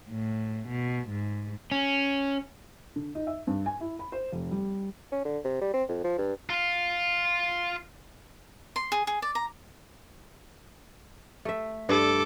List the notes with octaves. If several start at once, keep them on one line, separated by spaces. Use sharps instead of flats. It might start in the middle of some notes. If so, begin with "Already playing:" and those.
A2
B2
G#2
C#4
D3
D#4
E5
G2
G#5
E4
B5
C5
F1
G3
C#4
D3
C3
G3
C4
F2
F3
G2
F4 F5
C6
G#4
G#4
D5
A#5
A3 E5
G2 A4 B4 D5 D6